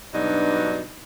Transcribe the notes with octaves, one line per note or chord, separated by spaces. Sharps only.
G2 B2 F#3 D4 D#4